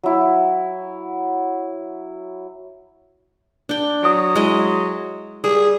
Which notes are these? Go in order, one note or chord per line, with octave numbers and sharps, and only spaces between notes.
F#3 E4
D4 G5
F#3 D#6 D7
G#3 E4 D#5
G3 G#4